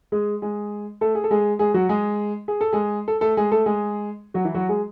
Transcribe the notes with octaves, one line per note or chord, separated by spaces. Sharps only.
G#3 G#4
G#3 G#4
A3 A4
G#4
A4
G#3 G#4
G#3 G#4
F#3 F#4
G#3 G#4
G#4
A4
G#3 G#4
A4
A3 A4
G#3 G#4
A3 A4
G#3 G#4
F#3 F#4
E3 E4
F#3 F#4
G#3 G#4